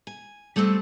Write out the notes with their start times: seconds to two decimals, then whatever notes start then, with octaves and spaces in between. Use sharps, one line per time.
0.07 G#5
0.56 G3 A3 B3 C4 A4